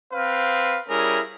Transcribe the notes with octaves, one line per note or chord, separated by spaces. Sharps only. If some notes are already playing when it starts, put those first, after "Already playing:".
C4 B4 F5
G3 C#4 E4 G#4 A#4